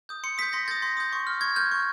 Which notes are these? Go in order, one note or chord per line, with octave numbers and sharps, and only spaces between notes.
D#6 G6
C6 C#7
D#6 G6 B6
C6 A#6
D#6 G6 A6
C6
D#6 G6
C#6
F6
C#6 G#6
F6 G6
C#6